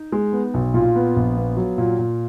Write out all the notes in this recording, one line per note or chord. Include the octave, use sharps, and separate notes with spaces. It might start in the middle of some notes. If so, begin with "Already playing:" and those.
Already playing: D#4
G#3
B3
B1
A#2 F4
B3
A#1
B3
F#3
A#2
A#2